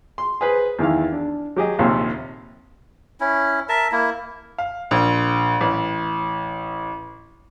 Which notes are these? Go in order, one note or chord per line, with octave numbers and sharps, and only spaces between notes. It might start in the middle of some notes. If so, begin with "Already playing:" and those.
C6
G#4 B4 C5
E2 D#3 E3 F5
D4
F#3 G4 G#4 D#5
A#1 D#2 C3
C#4 E4
A#4 E5 A5
A#3 E4
F5
A#1
A1